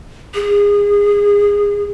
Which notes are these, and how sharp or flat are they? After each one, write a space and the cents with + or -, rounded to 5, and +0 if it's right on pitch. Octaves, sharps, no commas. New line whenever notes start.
G#4 -25